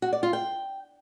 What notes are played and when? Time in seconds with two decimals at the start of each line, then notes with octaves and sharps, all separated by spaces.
0.02 F#4
0.13 D5
0.23 F4
0.33 G5